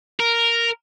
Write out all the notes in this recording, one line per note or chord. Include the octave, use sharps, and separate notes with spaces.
A#4